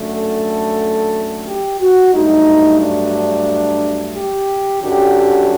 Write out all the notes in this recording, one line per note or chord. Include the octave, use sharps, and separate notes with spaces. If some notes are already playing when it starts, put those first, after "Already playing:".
Already playing: F#2 D3 A3
A4
G4
F#4
G2 F#3 A3 D#4
D4
G4
F#2 D3 F#3 G4